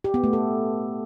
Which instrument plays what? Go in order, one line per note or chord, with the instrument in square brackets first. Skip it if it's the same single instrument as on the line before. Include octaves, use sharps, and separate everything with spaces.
[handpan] G4
B3
A3
A4